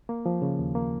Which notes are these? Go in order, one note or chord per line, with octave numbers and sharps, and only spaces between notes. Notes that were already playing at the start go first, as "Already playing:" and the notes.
A#3
F3
C#3
D#2
A#3